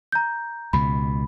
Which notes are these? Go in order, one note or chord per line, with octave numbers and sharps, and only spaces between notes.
A#5 G6
C#2 B2 B5